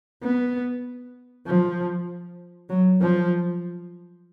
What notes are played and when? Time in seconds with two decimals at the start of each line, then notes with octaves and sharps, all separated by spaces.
0.23 B3
1.47 F3
2.69 F#3
3.01 F3